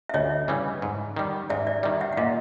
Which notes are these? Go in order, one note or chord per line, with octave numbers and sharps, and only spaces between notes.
E5
D2 C#5 D#5
C#3 E3 G3
G#2
D#3 G3
G#2 D5 E5
D5 E5
D#3 G3 D5 E5
E5 F#5
F#5
A#2 D#5 F5